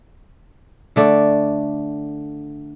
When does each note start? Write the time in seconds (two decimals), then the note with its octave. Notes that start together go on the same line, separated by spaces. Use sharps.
0.96 D3 A3 D5